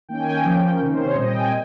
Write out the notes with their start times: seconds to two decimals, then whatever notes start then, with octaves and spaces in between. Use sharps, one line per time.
0.09 D#3 A#3 C#4 G5
0.19 G#5
0.30 G5
0.44 F3 A#3 C#4
0.80 C3 D#3 A#3 C#4
0.92 C5
1.04 C#5
1.15 A#2 G3 C4 D#5
1.27 G5
1.39 G#5